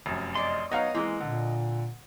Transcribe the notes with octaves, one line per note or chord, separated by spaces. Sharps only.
F1 F#2
D5 D#5 C6
F#3 B3 D#4 C#5 D#5 F5
E3 G#3 A#3 C4
A#2 D3